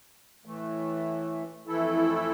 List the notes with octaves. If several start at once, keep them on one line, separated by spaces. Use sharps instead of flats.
A2 E3 A3
F2 E3 A3 E4 A4